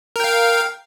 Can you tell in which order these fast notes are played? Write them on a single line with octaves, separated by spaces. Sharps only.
A#4 G5 F5